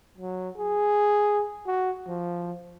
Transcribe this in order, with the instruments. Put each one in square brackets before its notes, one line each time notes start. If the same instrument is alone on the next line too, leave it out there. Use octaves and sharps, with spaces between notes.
[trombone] F#3
G#4
F#4
F3